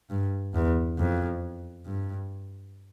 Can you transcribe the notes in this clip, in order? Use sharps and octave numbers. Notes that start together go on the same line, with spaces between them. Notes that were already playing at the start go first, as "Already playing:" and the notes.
G2
E2
F2
G2